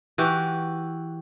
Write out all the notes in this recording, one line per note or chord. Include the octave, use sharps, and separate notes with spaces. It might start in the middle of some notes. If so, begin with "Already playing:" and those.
E3 F#4 G4